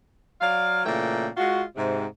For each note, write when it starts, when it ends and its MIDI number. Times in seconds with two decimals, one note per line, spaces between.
0.41 0.81 54
0.41 0.81 74
0.41 0.81 77
0.85 1.28 46
0.85 1.28 49
0.85 1.28 52
0.85 1.28 57
0.85 1.28 79
1.37 1.62 56
1.37 1.62 65
1.37 1.62 66
1.76 2.04 44
1.76 2.04 48